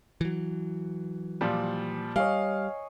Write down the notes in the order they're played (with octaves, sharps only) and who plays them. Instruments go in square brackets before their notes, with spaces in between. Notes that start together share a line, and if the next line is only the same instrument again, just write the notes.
[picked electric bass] E3 F#3
[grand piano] A#2 F3 G3
[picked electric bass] G3 [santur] C#5 D#5 G#5 [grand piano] F5